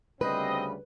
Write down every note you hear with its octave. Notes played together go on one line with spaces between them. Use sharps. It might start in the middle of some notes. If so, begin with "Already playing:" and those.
D2 C#3 G3 C4 B4 D#5